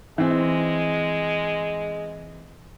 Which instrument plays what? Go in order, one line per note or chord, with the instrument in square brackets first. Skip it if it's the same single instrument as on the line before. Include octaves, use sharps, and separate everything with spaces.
[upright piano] E3 C4 [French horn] G#3